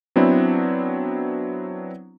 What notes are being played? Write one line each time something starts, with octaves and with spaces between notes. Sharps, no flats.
F#3 B3 C4 D4 E4